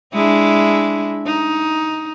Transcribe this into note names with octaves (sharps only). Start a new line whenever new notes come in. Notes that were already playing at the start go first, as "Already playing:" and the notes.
G#3 D4 E4
D#4